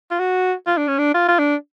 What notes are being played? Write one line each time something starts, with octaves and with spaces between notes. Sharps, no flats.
F4
F#4
F4
D4
C#4
D4
F4
F4
D4